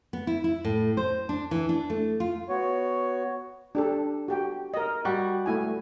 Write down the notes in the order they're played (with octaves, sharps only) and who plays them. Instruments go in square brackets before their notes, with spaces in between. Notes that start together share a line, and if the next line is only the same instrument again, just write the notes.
[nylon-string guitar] B3
E4
E4
A2
C5
D4
E3
D4
A3
F4
[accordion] B3 F#4 C#5
[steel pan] D4 G4 A4
F#4 G4 G5
A#4 D#5
[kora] G3 F#4
[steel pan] A3 E4 G#5